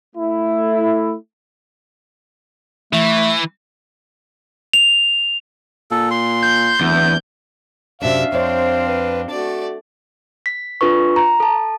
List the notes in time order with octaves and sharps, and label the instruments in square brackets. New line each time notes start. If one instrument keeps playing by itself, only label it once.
[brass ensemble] A3 E4
[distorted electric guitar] E3 [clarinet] A3
[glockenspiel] F7
[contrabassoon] A#2 [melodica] A4
[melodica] C6
[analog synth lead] G6
[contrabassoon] D1 [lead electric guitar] E2
[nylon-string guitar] F#2 C3 [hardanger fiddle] D4 E5 [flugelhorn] F5
[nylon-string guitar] F2 C#5 [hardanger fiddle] C4 D4 [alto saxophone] C5
[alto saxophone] B4
[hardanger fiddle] A3 D5 [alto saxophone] F#4
[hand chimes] B6
D4 F4 A4 B4 C#6
A#5
A4 A5